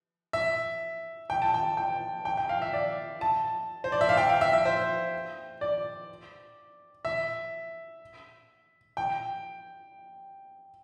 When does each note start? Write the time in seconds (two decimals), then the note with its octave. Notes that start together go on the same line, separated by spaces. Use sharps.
0.33 E5
1.30 G5
1.42 A5
1.54 G5
1.77 G5
2.25 G5
2.37 G5
2.49 F5
2.62 E5
2.73 D5
3.21 A5
3.84 C5
3.92 D5
4.01 E5
4.09 F5
4.17 G5
4.29 F5
4.41 E5
4.53 E5
4.65 C5
5.61 D5
7.05 E5
8.97 G5